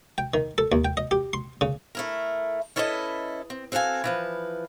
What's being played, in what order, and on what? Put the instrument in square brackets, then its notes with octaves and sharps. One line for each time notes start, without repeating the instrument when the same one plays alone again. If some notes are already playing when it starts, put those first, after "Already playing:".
[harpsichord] G5
D#3
A4
D#2
G5
D#5
G4
C6
C#3
[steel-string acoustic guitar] A3 E4 A#4
C#4 E4 A4 B4 C#5 D#5
C4
C4 F#4 A4 F5 G#5
E3 F3 B4